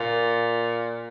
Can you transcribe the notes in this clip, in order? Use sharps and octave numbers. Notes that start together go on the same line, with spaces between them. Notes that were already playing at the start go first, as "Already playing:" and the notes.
Already playing: A#2